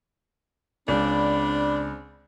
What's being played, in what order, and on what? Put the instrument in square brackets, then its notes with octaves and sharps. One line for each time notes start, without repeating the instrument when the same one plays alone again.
[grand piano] C#2 [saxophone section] C4 D5 [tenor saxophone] D4 [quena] B5